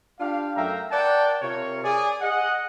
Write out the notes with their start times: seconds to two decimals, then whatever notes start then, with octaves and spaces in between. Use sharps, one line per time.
0.19 D4 F4 G4 F5
0.56 F#2 A3 E5 F5 G5 A#5
0.91 A#4 D5 F#5 G5 A5
1.41 C3 F4 A#4 C#5
1.84 G#4 D5
2.21 G#4 D#5 F#5